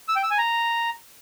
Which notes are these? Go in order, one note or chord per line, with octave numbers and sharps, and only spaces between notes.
E6
G5
E6
G#5
A#5